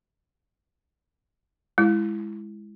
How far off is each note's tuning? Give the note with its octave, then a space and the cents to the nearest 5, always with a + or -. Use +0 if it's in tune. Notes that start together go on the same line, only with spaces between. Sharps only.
G#3 +0 E4 +10